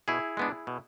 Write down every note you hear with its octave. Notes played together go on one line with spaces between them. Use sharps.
B2 E4 G#4
G#3 B3 D4
B2